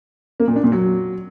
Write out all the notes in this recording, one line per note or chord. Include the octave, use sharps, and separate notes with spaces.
A#3
A#2
D4
A#2
F#3